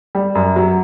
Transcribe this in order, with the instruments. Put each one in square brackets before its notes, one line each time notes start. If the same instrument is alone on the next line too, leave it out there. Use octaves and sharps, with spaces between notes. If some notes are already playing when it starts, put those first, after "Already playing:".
[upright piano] G3
F#2
F#3